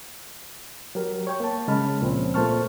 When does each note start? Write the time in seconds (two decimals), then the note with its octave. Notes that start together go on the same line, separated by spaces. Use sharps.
0.95 F#3 G4 A#4
1.27 C#5 G5 C#6
1.40 A#3 A5
1.68 C#3 G#3 A5 B5 F6
2.01 C#2 A#2 F3 C4 C#4
2.34 A#2 A3 C5 A5 C#6 F6